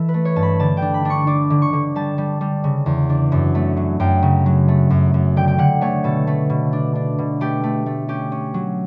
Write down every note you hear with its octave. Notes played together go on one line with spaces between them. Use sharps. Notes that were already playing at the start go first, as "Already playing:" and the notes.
Already playing: E3 A4 E5
B4
A3
C#5
G2 A5
B5
D3 A5
G5
D4
B5
D4 C#6
D4 D6
D3
C#6
D3
G3 A5
G3
G3
C#3
E2
D4
F#2
A3
F#3
F#2 G5
C#3
F#3
A3
F#2
F#2
D3 G5
G5
D3 F#5
A3 C#5
B2 A4
A3
B2
D4
D4
B2
A3 G4
A3
A3
C#4 G4
C#4
F#3